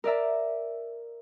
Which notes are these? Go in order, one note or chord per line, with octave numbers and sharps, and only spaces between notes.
A#4 D5 E5 A#5